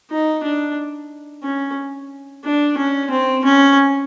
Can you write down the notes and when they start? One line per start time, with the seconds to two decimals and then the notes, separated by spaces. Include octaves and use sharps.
0.11 D#4
0.43 D4
1.43 C#4
2.45 D4
2.77 C#4
3.11 C4
3.45 C#4